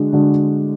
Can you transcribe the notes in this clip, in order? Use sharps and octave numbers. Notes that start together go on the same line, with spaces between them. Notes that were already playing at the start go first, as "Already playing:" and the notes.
Already playing: D3 G#3 D4 F#4
D3 G#3 D4 F#4